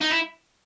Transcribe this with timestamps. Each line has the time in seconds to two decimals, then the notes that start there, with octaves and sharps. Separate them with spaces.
0.01 D#4
0.11 E4